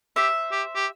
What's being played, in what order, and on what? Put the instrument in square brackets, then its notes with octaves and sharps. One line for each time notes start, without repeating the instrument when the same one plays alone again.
[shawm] G4 [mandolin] C5 E5
[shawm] G4
G4